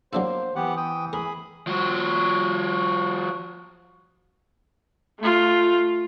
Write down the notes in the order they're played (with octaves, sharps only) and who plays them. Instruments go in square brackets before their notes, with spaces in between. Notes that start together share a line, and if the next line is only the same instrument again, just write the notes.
[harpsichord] F#3 D4 E4 [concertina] A#3 [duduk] C5
[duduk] E3 [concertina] B3 G4 F#5
[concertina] G5 D#6
[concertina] G#4 B5 [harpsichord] A#4
[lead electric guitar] F3 F#4
[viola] A3 F4